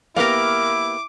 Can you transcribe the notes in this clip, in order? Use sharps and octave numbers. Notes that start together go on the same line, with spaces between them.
A#3 B3 E4 G4 A#4 F5 D6